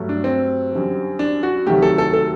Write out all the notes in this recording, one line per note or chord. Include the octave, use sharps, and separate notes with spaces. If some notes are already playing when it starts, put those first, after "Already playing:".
Already playing: G2 F#3 A3
D4
C4
F#2 D3 G3
D4
F#4
D2 C3 D#3 F#3 A3 G4
A4
A4
A4